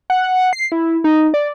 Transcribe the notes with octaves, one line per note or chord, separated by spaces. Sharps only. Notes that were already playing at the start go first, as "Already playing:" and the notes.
F#5
C7
E4
D#4
D5